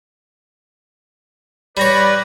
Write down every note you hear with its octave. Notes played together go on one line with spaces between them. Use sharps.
G3 B4 C#5 D5 B5 A#6